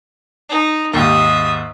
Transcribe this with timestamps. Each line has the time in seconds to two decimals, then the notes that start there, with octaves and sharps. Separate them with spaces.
0.49 D#4
0.94 D#2 G#2 G4 E5 D#6